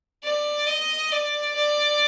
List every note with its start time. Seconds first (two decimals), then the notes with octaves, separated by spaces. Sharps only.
0.23 D5
0.67 D#5
1.12 D5
1.55 D5